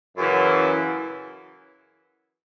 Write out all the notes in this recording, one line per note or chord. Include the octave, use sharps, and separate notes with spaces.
F#2 C#3 E3